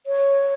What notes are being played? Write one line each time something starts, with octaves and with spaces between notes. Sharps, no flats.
C#5